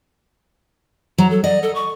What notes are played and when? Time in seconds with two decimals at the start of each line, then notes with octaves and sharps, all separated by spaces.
1.18 F#3 A#5
1.30 A4
1.44 D5 D#5
1.63 A4
1.75 C#6